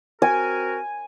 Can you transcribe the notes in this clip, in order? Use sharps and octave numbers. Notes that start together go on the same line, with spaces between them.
C4 F#4 A#4 G#5